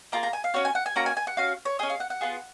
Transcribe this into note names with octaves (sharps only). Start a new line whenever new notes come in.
A#3 F4 G#4 A#5
A#5
G#5
F5
C#4 F#4 C#5
G#5
F#5
G#5
A#3 C#4 F#4 A#5
G#5
G#5
F#5
C#4 F#4 F5
C#5
C#4 G#4 D#5
F5
F#5
F#5
B3 F4 G#4